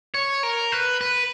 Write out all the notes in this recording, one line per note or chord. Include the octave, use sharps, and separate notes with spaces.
C#5
A#4
B4
B4